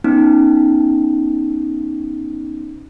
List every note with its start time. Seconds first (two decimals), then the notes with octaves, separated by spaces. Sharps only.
0.04 B3 C#4 D#4